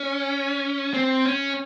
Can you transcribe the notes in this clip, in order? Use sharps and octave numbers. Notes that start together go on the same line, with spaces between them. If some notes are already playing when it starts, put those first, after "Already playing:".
Already playing: C#4
C4
C#4